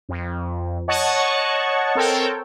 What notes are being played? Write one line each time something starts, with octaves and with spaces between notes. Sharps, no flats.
F2
C#5 D#5 F#5 A5 C#6
C4 A4 A#4 C#5 G5